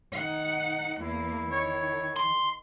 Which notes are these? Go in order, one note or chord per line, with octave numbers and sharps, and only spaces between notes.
D#3 D#4 F#5
E2 A#3 E4
D#3 C#5
C6